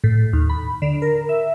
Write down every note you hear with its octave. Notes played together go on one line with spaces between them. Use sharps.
A2
D#2
B5
D3
A#4
E5